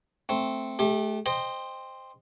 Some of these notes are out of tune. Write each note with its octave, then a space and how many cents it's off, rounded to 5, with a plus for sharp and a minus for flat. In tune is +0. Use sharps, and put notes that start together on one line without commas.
A3 +0 C4 +0
A3 -30 G4 +10
C5 +0 D#5 -15 G5 +20